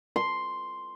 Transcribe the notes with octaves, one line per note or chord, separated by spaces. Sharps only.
C6